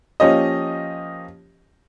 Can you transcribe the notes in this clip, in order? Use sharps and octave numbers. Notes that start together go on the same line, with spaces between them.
F3 A#3 C#4 G4 D#5